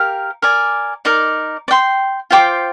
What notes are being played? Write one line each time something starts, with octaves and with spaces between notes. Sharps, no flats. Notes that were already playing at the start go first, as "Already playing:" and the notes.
Already playing: G4 A#4 F5
A#4 D5 G#5
D#4 A#4 D5
D5
G5 C6
F4 C5 G5 D6